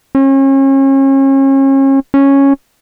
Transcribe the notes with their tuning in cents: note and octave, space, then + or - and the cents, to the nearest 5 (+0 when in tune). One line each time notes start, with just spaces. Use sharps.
C#4 -35
C#4 -5